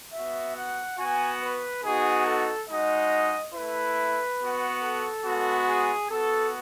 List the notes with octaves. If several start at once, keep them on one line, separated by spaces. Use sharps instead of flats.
B3 F#4 E5
F#5
B3 F#4 G#5
B4
B3 D#4 F#4 G#4
A4
G#3 D#4 F#4 D#5
A3 E4 B4
B3 F#4
A4
G#3 B3 F#4
G#4
B3 F#4 A4